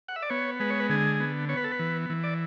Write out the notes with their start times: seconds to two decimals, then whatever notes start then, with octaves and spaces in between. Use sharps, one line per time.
0.08 F#5
0.16 E5
0.22 D5
0.30 B3 C#5
0.60 G#3 B4
0.70 C#5
0.80 B4
0.89 D3 G#4
1.20 B3
1.49 B3 C#5
1.57 B4
1.64 A4
1.72 B4
1.79 E3
2.10 E3
2.24 D5